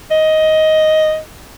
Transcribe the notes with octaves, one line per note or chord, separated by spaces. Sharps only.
D#5